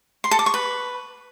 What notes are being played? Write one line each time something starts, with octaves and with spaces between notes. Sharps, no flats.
C6
A4
D6
C#6
B4